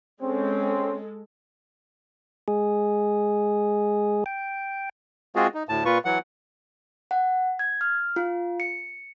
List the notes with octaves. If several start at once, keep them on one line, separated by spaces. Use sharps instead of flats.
G#3 C4 C#4 A4
G#3 G#4
G5
G#3 C4 F4 F#4 G#4
D#4
D2 A2 A5
A#2 F4 B4 C#6
E3 F#3 F#5
F#5
G#6
F6
F4
C#7